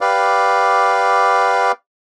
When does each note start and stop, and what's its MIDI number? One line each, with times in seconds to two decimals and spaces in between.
0.01 1.72 67
0.01 1.72 71
0.01 1.72 74
0.01 1.72 77